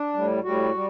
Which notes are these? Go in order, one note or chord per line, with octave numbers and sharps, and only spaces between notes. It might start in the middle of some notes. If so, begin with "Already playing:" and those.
Already playing: D4
A2 G3
A2 G3 F#4
G3